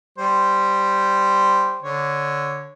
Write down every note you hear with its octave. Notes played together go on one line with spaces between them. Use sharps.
G3 C5
D3 C#5